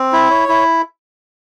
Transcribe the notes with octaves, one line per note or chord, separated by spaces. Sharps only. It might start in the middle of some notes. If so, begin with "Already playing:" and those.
Already playing: C4
E4
C#5
E4